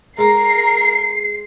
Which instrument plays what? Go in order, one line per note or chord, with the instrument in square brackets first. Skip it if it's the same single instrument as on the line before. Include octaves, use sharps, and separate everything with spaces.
[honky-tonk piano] G#3 [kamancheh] A#4 [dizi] A#5 [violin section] C7